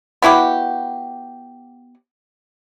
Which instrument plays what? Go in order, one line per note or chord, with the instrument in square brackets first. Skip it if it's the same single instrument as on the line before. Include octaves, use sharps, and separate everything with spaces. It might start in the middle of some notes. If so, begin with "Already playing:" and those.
[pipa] B3 E4 F#4 G4